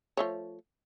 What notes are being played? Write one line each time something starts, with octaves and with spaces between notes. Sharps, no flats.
F3 A3 C#5